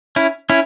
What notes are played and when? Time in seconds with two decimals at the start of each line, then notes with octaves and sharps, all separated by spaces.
0.16 C#4 E4
0.50 C#4 E4